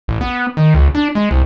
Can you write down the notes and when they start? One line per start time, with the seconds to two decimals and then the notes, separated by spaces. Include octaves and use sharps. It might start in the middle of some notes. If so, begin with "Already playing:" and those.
0.08 A1
0.21 B3
0.57 D#3
0.74 C#2
0.95 D4
1.15 G#3
1.31 C2